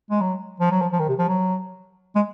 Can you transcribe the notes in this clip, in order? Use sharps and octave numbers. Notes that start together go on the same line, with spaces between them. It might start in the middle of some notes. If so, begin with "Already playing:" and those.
G#3
F#3
F3
F#3
F3
F3
D#3
C3
F3
F#3
G#3